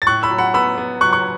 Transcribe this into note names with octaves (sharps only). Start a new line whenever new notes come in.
A6
A2 C#6 F#6
B5 E6
F#3
F#5 B5
B3 B5 E6
B3
F#3 C#6 F#6
C#6 F#6